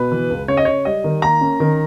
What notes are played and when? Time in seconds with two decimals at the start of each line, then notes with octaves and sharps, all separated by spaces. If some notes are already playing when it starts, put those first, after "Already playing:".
Already playing: B2 B4
0.12 E3
0.30 C#2
0.48 C#3 C#5
0.57 D#5
0.65 C#3 C#5
0.85 G3 D#5
1.04 D#3
1.22 A#3 A#5
1.41 C#4
1.60 D#3